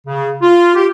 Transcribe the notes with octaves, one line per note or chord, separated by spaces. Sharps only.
C#3
F4
G4